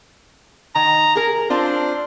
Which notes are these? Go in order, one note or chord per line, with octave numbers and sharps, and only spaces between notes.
D#3 A#5
G#4 A#4
C4 D4 F4 C5